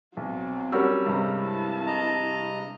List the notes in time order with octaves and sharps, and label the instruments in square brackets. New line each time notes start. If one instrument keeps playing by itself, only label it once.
[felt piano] B1 [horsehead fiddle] F#3 C4
[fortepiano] G3 C#4 A#4 [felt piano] F#4 E6
[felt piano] G2 C3 G#3 [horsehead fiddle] A#5
[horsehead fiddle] E4 A5
[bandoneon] D#5 A#5